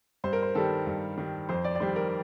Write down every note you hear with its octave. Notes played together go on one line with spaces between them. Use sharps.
G2 C5
A#4
C5
D#3 G3 A4
G2
D#3 G3
F2 C5
D5
D5
D#3 G3 C5
A#4